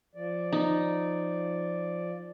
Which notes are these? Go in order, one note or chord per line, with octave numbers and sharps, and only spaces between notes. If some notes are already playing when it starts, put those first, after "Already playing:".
F3 D5
D#4